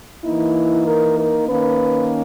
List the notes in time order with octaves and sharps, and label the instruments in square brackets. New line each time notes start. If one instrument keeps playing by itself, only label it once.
[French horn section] E3 A#3 D#4 E4
A#4
A#4
D#3 A#3 C#4 B4